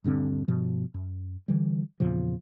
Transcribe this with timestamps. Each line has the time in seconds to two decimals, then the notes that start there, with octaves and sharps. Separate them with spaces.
0.04 D#1 G2 D3 C4
0.48 G2 B2 F3
0.94 F#2
1.48 D3 E3 G3
2.00 E2 A#2 C#3 F3